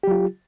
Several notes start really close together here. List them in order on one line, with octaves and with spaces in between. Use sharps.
G4 F#3 F4